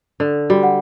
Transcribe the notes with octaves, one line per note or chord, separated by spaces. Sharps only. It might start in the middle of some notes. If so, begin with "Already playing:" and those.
D3 A4
G3 F#4
F#5